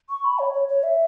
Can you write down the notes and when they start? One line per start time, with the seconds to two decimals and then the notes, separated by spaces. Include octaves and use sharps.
0.10 C#6
0.25 B5
0.39 C#5
0.53 C#5
0.68 C#5
0.83 E5